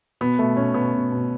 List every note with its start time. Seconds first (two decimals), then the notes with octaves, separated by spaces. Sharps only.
0.21 B2 B3
0.39 B2 A3
0.57 B2 C#4
0.74 B2 B3
0.94 B2
1.12 B2